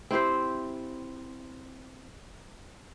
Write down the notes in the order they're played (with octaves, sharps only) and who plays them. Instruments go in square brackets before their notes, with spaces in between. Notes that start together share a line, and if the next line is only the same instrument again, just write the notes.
[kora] C4 E4 G4 C5